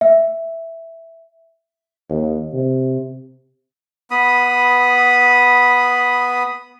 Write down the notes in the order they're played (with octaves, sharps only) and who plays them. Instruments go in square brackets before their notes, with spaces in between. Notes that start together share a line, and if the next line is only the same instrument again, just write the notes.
[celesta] E5
[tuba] D#2
C3
[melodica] B3 B5 D#6